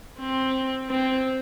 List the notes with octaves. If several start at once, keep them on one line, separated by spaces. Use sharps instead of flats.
C4
C4